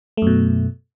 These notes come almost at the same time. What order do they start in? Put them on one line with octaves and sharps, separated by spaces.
A3 F#2 B2